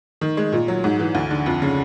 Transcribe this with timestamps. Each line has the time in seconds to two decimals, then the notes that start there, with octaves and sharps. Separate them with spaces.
0.21 D#3
0.37 G#3
0.52 A#2
0.68 F#3
0.84 G#2
1.00 E3
1.15 D2
1.31 D3
1.46 F2
1.62 C#3